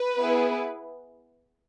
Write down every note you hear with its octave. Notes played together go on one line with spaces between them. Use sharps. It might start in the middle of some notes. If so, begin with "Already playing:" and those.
Already playing: B4
B3 E4 G#4